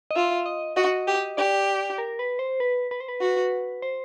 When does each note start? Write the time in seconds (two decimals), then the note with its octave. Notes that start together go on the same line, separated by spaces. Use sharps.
0.11 D#5
0.15 F4 E5
0.46 D#5
0.77 F#4 D#5
1.07 G4
1.37 G4 D5
1.98 A#4
2.19 B4
2.39 C5
2.60 B4
2.91 B4
3.00 C5
3.08 B4
3.21 F#4
3.82 C5